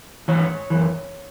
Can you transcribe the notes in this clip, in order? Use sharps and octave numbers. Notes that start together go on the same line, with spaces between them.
G#2 E3 C#5
F#2 E3